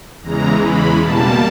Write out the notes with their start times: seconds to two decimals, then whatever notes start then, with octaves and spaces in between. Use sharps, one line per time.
0.22 E2 C#3 E3 G#3 A#5
0.61 B5
1.00 B2 G3 A#3 A5